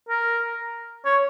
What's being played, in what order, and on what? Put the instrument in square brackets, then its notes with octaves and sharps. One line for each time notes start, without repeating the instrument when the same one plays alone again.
[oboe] A#4
C#5